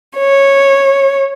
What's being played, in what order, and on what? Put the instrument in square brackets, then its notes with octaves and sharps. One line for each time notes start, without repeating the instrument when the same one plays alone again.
[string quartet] C#5